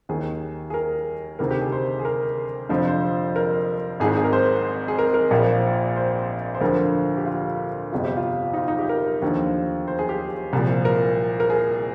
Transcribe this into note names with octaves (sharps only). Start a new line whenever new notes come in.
D#2 D#3 G#4
G#4
A#4
D2 C3 D#3 A#4
G4
G#4
C5
G#4
A#4
F1 F2 D3 F3 C5
C5
A#4
G#1 G#2 D#3 G#4
G#4
A#4
C5
G#4
A#4
A#4
A#1 A#2 F3
C5
C5
D2 D3 F3 A#4
G4
F4
G1 F2 C3 F4
G4
F4
D#4
F4
D#4
G4
A#4
D#2 D3 F3
C5
G#4
G4
C2 A#2 F3
A#4
A#4
G#4